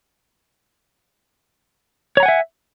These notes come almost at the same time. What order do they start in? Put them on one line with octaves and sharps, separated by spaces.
C#5 A#5 F#5 G#5 E5